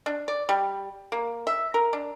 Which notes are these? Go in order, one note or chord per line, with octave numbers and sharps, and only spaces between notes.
D4
D5
G3
A#3
E5
A#4
D4